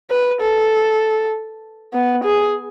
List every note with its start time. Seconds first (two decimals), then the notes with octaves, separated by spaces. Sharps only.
0.10 B4
0.41 A4
1.94 B3
2.23 G#4